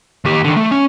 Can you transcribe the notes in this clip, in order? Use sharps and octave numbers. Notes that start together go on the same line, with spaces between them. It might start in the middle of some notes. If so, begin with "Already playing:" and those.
D#2 G4
D3 D#3
A3
C#4